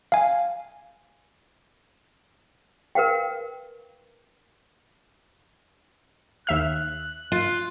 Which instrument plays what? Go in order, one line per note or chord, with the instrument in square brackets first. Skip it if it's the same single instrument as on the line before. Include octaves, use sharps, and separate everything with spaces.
[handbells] F5 G#5
[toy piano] A#4 B4 F5 G5
[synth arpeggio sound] D#2 E5 F6 [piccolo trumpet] F#6
[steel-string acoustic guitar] F4